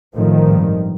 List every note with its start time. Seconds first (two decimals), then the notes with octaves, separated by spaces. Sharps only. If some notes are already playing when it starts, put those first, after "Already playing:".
0.15 A1 A2 D#3 F3
0.45 G#1 G2